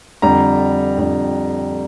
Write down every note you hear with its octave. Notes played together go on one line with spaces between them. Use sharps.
F2 D3 G3 A#5
F2 D3 G3